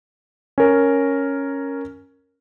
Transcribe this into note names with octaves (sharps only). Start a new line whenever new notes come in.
C#4 A#4